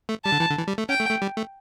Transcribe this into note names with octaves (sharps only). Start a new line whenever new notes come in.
A3
G3 A5
D3
E3
D3
E3
G3
A3
C#4 G5
A3
A3
G3
A3